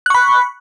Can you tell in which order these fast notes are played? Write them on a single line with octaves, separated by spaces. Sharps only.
F#6 C#6 B5